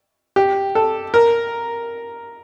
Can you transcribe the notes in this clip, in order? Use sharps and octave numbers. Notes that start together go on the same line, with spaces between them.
G4
A4
A#4